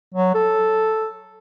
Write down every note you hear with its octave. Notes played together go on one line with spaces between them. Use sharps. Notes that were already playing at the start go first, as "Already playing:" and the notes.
F#3
A4